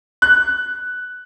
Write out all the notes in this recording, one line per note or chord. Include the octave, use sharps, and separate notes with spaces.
F#6